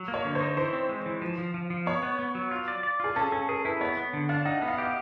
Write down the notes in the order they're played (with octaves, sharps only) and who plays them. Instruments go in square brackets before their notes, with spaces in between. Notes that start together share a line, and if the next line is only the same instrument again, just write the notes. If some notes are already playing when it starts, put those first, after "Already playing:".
Already playing: [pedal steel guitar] F#3
A#3
[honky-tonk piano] C#5
[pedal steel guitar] D3
[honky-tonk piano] C5
[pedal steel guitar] D#4
[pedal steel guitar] E3 [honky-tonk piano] C5
[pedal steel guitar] C4
G#3
E3
F3
F3
F3
F3
[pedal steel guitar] B3 [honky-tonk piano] C#5
[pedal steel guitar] B3
B3
F#3
F4
D5
D5
[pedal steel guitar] F4 [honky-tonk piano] G#4
[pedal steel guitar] C#4 [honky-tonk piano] A4
[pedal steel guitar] C#4 [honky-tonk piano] A4
[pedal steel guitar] G#4 [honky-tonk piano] A#4
[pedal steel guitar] E4 [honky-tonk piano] B4
[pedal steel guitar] B3 [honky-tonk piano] C#5
[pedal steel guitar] B3
D3
[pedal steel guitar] D4 [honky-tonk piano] F5
[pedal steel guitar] D#4 [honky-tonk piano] F#5
[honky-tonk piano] E5
[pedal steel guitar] B3
[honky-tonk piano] F5
[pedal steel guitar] G4 [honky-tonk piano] D#5